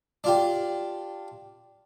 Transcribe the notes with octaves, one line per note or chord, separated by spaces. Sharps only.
D4 F4 G4